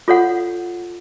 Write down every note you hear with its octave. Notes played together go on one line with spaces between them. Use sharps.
F4 A4 C#5 F#5